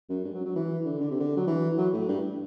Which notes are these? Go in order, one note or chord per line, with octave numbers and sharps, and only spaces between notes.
F#2
G2
F#3
F#3
E3
D3
D3
C3
D3
F#3
E3
F#3
A2
G2